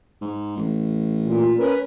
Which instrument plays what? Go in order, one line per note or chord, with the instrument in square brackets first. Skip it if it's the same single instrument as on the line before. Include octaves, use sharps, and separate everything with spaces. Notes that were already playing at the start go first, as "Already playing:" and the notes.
[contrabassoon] G#2
A1
[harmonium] A#2
C#4 A#4 B4